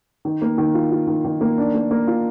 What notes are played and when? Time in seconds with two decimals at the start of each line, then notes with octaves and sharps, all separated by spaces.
0.25 D#3
0.42 A#3
0.58 D#3
0.74 F4
0.91 F4
1.07 D#3
1.25 D#3
1.41 A#3
1.58 D4
1.74 A#3
1.91 A#3
2.07 F4